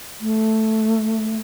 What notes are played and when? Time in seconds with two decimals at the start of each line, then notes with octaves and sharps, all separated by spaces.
0.20 A3